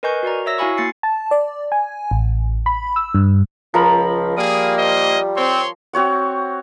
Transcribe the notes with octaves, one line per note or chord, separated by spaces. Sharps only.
A#4 B4 D#5 G#5 C#6 G6
F#4 A#4 D5 A#5
C#5 E5 E6 A#6
E4 F#4 F5 G#5 B5 C#6
A#3 A6 C7 C#7
A5
D5
G#5
A1
B5
E6
G2
C#2 F3 A#4 B5
G3 A#3 G#4 D#6
C5 D#5
C4 C#5 C6
C4 F#4 C#5 F#5